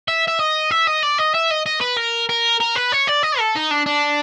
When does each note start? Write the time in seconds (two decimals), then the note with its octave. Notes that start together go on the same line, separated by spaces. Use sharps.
0.08 E5
0.28 E5
0.40 D#5
0.71 E5
0.87 D#5
1.03 D5
1.18 D#5
1.34 E5
1.51 D#5
1.66 D#5
1.81 B4
1.97 A#4
2.29 A#4
2.60 A#4
2.76 B4
2.92 C#5
3.08 D5
3.23 D#5
3.39 A4
3.55 D#4
3.71 D4
3.86 D4